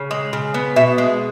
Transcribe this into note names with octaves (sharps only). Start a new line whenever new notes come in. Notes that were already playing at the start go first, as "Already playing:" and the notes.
Already playing: C#3
G#3
C#3
B3
B2 E5
G#3